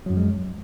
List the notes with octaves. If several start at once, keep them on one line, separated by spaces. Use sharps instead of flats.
F#2 F3 F#3 G#3